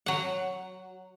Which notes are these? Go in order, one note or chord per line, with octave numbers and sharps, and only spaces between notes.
F#3 F#5